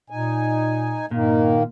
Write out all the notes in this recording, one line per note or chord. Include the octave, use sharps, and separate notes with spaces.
A#2 D#4 G#5
G2 A#2 D#3 A#3